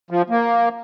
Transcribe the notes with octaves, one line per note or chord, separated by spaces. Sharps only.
F3
A#3